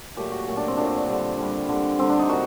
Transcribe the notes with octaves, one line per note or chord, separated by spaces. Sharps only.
A#2 F#3 A3 G4
F#4
A#2 F#3 A3
D4
C4
A#2 F#3 A3 D4
D3 G3
D3 G3
D3 G3
D3 G3 C4
D4
D#4
A#2 F#4